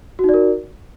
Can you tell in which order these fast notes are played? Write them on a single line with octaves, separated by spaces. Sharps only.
F#4 D#4 D5 A#4